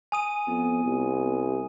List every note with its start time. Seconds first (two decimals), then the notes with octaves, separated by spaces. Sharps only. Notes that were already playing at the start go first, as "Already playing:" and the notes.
0.12 G#5 D#6 D#7
0.47 F2 B3
0.84 C2